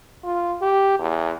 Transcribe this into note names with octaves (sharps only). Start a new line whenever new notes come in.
F4
G4
E2